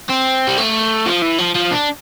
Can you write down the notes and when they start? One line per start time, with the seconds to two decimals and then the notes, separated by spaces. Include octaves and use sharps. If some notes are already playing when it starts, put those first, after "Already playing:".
0.09 C4
0.48 G3
0.58 A3
1.06 F3
1.22 E3
1.38 F3
1.55 F3
1.71 D4